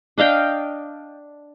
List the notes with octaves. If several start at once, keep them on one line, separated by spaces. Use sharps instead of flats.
D4 D#5 F5 G5